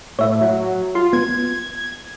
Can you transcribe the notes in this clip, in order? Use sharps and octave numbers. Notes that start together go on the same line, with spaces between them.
A2 C#5 E5
F#3
F4 C6
B3 G#6